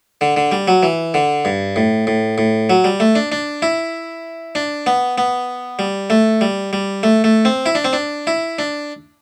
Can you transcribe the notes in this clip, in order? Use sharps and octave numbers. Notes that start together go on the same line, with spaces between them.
D3
D3
G3
F#3
E3
D3
G2
A2
A2
A2
F#3
G3
A3
D4
D4
E4
D4
B3
B3
G3
A3
G3
G3
A3
A3
C4
E4
D4
C4
D4
E4
D4